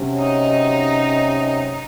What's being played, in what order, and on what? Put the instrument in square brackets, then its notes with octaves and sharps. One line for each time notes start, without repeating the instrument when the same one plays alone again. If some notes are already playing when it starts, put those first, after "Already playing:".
Already playing: [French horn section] C3 F#3 C#4
[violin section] D#4